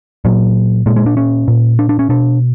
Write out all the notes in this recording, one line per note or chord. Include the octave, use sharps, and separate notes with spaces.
A#2 F#3
A#2 G#3
G#3
D4
C#4
A#2
D4
D4
C#4
B2 D4